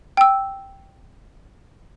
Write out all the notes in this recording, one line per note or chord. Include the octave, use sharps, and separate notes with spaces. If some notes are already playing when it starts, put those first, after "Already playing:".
G5 E6